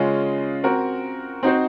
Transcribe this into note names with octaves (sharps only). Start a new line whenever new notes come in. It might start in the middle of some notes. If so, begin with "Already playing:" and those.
Already playing: C#3 G#3 C#4 F4
C4 F#4 A#4
C4 D#4 F#4 C5